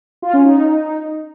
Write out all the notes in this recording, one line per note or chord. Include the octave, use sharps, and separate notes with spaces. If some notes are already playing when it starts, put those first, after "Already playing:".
F4
C#4
D#4